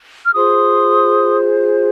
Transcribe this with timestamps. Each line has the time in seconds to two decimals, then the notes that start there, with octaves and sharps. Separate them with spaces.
0.25 F6
0.35 F4 G#4 C5 C6 D#6